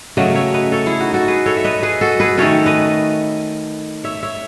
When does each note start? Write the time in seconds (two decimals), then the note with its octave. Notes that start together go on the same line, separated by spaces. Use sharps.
0.17 C#3 F#3 A3 C#4 D#5 F#5
0.35 C#5 E5
0.54 B4 D#5
0.72 A4 C#5
0.86 E4 G#4
1.00 D#4 F#4
1.14 F#4 A4
1.28 G#4 B4
1.46 A4 C#5
1.57 E5
1.64 B4 D#5
1.83 G#4 B4
2.01 F#4 A4
2.20 G#4 B4
2.37 D#3 A3 C#4 A4 C#5
2.66 B4 D#5
4.04 C#5 E5
4.23 C#5 E5